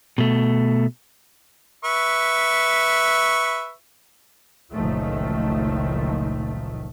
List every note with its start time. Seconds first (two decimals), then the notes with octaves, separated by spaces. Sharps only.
0.18 B2 A3
1.84 B4 E5 C#6
4.72 F#1 C#2 A#2 D#3 F3 A3